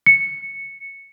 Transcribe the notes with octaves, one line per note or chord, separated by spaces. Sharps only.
C#7